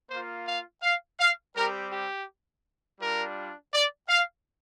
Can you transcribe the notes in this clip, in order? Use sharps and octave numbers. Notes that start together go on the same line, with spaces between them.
A#3 F4 C5
F5
F5
F5
G3 C4 G4 A#4
G4
G3 D4 F4 A#4
D5
F5